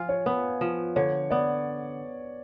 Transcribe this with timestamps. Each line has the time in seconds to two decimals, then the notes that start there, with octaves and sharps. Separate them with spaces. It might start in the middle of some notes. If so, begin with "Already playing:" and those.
Already playing: F3 F4 F5 G#5
0.09 C#5
0.26 B3 B4
0.61 F3
0.96 D3 C#5
1.30 B3 D5